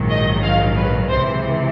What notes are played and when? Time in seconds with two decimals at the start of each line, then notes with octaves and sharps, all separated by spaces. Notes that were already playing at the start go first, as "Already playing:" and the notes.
Already playing: A#1 G#2 D#3 F#3
0.09 D#5
0.43 F5
0.76 B4
1.09 C#2 C3 E3 C5